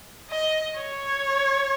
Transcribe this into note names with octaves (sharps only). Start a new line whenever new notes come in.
D#5
C#5